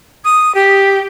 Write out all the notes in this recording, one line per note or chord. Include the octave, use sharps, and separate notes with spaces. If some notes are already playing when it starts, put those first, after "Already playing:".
D#6
G4